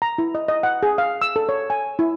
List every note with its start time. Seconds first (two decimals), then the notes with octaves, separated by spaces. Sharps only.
0.02 A#5
0.18 E4
0.35 D#5
0.48 D#5
0.63 F#5
0.83 G#4
0.98 F5
1.22 E6
1.36 A4
1.49 C#5
1.70 G#5
1.99 E4